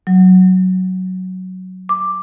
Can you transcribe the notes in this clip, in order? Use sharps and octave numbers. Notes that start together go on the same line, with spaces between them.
F#3
D6